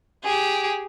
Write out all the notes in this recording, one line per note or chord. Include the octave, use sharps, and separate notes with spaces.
G4 G#4